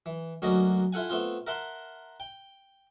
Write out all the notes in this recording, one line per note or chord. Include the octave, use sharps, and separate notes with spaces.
E3
D2 F#3 A#3 C#4 D#5 A#5
E4 F4 A4 F#5 G#5
A3 B3 C4 F4
A#4 E5 F#5 A5 C6
G5